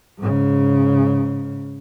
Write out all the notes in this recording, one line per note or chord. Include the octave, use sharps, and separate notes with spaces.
G#2 C#3